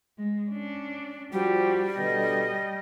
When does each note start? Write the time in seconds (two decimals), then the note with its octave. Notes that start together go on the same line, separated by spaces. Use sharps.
0.18 G#3
0.51 C#4 D4
1.32 F3 G3 D4 F#4 G4
1.97 B2 D3 D#5